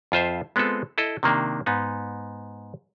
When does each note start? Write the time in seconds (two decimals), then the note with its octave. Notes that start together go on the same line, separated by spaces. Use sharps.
0.12 F2 F4 C5 E5
0.56 G#3 B3 C4 F4 A4
0.98 E4 A4 D#5
1.23 C3 D#3 A#3 D4
1.66 G#2 B3 D#4